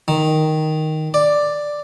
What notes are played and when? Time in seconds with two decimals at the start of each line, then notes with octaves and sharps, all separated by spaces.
0.08 D#3
1.14 D5